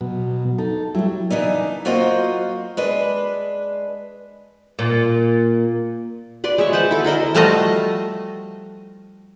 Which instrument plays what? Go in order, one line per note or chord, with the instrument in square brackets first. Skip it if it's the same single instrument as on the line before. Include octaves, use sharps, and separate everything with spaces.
[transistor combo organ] B2 F#3
[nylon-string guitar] D#4 [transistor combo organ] A4
[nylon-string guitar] F#3 A3 [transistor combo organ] G3 E4
[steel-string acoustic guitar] C#3 E3 D4 D#4
F#3 A#3 F4 F#4 C5 D#5
G#3 D4 B4
[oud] A#2
[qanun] B4 D5 C6
G#3 C#5 E5 C#6
B4 C5 F#5 A5
E4 A4
E4 A#4 D#5 E5
[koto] F3 G3 A3 F4 F#4 D#5